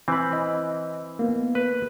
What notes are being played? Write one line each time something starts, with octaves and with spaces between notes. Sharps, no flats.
E3 C4 G#5 B5
D#5
A#3 B3
B4